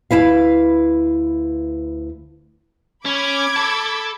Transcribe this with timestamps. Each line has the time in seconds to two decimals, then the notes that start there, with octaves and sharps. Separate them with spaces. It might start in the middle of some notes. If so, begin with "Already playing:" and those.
0.11 D2 D#3 E4 B4 F5
3.06 C#4 B5 D6 G#6
3.56 A4 A5